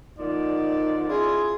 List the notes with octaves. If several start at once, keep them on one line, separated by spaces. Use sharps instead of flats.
A#2 D3 F3 D#4 D5
C#4 E4 F4 G#4